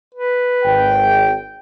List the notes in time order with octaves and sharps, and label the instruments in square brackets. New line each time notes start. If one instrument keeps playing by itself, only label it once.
[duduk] B4
[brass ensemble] G#1 G5